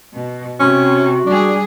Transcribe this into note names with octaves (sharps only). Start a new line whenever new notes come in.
B2
C3 C#4 F#4
G3 D4 G#4